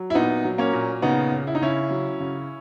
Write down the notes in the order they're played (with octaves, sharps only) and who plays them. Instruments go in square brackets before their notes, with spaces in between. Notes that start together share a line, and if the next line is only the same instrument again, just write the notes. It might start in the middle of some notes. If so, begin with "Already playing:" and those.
Already playing: [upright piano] F#3
E4
A#2 B3 D#4
F#3
A#3 C#4
A#2
C#3 B3 D#4
C#3
E4
D#4
C#3 C#4 E4
F#3
C#3